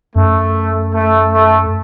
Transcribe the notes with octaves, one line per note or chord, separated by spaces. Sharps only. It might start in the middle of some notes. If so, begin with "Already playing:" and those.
F#2 A3
A3
A3